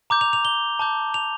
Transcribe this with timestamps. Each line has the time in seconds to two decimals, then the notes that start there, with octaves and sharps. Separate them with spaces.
0.10 A#5 D6 G6
0.21 F7
0.33 F7
0.45 G7
0.79 A5 D6 G6
1.14 F7